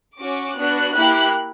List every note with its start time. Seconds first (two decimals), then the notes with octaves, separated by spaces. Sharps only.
0.17 C#4 F#4 D6
0.55 B3 D4 F#4 F#6
0.94 A#3 E4 G4 F#6